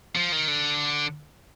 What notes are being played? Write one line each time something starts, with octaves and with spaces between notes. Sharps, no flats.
F3
D#3
D3